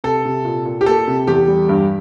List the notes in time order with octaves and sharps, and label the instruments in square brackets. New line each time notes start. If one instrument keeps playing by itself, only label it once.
[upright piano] C3 [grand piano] A4
[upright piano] C3
A#2
A#2
[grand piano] G4
[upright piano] A#3 [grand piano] A4
[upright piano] C3
[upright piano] E2 [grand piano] G4
[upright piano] G3
G2